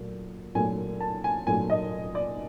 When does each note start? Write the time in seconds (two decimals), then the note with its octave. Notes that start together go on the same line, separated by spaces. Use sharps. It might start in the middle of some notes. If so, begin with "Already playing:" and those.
Already playing: A#2 F#3 A3
0.55 A#2 F#3 A3 G#5
1.00 A5
1.24 G#5
1.47 A#2 F#3 A3 G#5
1.70 D#5
2.15 D5